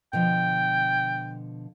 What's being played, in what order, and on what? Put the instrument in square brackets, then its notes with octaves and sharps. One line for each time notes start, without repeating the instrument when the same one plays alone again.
[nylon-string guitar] B2 D3 F3 [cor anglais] G5